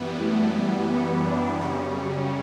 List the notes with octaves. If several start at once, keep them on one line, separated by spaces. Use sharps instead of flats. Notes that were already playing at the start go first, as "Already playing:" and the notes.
Already playing: F#2 E3 G3 B3
A3
G3
B3
D4
F#2 C#3 G3 C#4
C#4